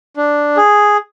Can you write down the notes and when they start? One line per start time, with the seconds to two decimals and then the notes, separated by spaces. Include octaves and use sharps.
0.17 D4
0.57 G#4